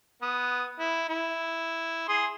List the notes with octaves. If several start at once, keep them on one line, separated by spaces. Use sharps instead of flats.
B3 D#6
E4
E4
G#4 C6 D#6